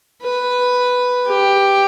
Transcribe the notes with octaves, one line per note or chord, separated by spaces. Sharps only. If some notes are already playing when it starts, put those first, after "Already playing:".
B4
G4